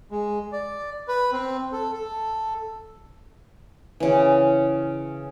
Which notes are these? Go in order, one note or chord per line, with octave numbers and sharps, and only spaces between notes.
G#3
D5
B4
C4
A4
A4
C#3 E3